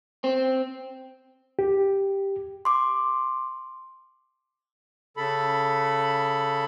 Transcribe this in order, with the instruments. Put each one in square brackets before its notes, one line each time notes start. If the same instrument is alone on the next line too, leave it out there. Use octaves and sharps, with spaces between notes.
[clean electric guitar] C4
[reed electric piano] G4
[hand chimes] C6 D6
[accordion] C#3 A4 B5